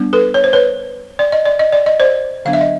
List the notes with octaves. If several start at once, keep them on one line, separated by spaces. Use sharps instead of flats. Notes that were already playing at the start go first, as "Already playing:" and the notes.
Already playing: G3 B3 D4
A4 B4
C#5
C5
B4 C#5
D5
D#5
D5
D#5
D5
D#5
C5 D5
D3 F#3 B3 D4 F5
E5
D#5